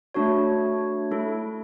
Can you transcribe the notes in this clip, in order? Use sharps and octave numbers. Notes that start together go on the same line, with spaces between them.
A3 D4 F#4 C#5
A3 E4 A4